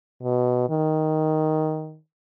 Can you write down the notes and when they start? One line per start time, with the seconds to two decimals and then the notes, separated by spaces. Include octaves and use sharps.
0.23 B2
0.70 D#3